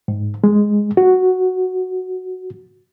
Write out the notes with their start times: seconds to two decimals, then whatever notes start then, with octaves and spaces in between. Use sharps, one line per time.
0.08 G#2
0.44 G#3
0.97 F#4